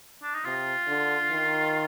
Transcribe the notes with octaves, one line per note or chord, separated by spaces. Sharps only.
D4
D#4
C3 F4
D3
D#3